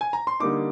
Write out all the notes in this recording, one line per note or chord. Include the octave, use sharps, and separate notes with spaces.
G#5
A#5
C6
D3 G3 A#3 D#4 D6